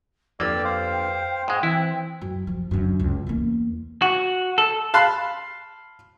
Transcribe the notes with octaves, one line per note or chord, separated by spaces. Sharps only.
G1 F2 A#3 G4 D5 G5 E6
C5 F5
G#2 G#3
E3 C4 E4 F#6
F#2
F3
F#2 D3
C#2
E2 A#3
F#4
A4
F5 A5 B5 C6 F#6